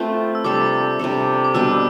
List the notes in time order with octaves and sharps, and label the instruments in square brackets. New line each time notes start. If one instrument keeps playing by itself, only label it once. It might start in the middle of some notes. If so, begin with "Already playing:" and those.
Already playing: [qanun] A3 C4 F4 B4
[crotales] E6
[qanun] C3 G3 D4 A4 [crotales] D6
[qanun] C3 G3 D4 A4
[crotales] D6
[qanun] B2 G3 D4 G4 [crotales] E6